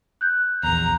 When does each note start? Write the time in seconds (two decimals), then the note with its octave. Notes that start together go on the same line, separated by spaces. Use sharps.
0.21 F#6 G6
0.63 A#1 E2 A#5